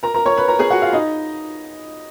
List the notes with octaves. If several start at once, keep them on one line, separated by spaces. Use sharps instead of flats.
A#4 A#5
A#4 A#5
C#5 C#6
B4 B5
A#4 A#5
G#4 G#5
F#4 F#5
F4 F5
D#4 D#5